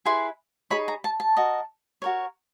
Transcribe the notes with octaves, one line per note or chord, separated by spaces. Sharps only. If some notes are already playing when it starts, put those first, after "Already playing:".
E4 G#4 B4 C6
D#4 G#4 C#5 B5
A#5
A5
A5
F#4 A#4 D#5
F#4 A#4 C#5